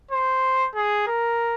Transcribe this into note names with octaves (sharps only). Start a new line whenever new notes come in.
C5
G#4
A#4